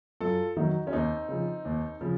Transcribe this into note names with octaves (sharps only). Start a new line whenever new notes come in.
F#2 F4 A4
D#3 F#3 D#4 F#4
C#4
D#2 C4 D#4
C#3 F3
D#2
C#3 F3